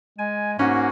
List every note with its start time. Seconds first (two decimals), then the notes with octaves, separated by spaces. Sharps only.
0.19 G#3 G#5
0.59 G#2 A#3 C#4 F#4